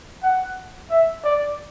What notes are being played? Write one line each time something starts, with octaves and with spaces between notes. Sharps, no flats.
F#5
E5
D5